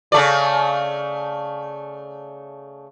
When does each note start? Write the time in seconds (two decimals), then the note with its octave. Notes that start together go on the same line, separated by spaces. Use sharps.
0.12 C#3 A3 D5